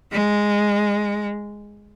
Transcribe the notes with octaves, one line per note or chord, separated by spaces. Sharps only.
G#3